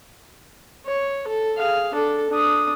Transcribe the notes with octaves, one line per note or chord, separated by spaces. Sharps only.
C#5
A4
G#4 F5
D4 A4
D4 D#6